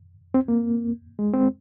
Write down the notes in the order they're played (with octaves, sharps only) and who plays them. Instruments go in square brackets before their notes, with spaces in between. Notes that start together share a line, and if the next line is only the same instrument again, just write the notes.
[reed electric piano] C4
A#3
G#3
C4